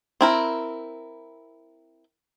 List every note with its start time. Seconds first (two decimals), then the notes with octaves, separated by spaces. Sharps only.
0.21 C4 E4 A#4